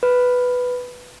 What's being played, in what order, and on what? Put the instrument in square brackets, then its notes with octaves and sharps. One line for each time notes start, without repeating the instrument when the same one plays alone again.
[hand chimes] B4